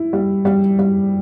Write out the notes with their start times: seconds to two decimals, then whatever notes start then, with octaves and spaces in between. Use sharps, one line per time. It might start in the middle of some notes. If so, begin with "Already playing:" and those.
Already playing: E4
0.13 G3
0.45 G3
0.79 G3